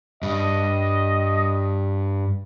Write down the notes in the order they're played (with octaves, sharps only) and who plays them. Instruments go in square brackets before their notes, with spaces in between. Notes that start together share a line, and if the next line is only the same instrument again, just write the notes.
[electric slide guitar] G2 [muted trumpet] D#5